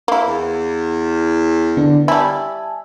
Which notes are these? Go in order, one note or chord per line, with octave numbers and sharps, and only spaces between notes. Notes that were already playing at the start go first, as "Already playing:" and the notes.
A#3 E4
E2
D3 B3 D4
G3 E4 E5 G#5 A5